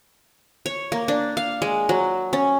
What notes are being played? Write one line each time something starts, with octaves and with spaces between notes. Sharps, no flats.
C#5
A#3
D4
F5
G#3
F#3
C#4